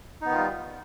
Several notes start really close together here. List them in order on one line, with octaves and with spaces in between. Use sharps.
D#4 B3 D#3 F4 G3